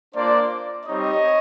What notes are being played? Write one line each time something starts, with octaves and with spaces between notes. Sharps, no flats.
A#3 D4 F4 C5 D5
G3 C4 D#4 G4 C#5 D#5